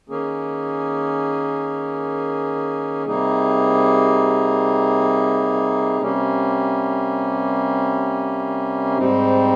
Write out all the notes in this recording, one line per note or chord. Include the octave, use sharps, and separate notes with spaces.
D#3 A#3 C#4 G#4
C3 G3 A#3 D#4 G#4
C3 G3 A#3 C#4
G#2 G3 C4 D#4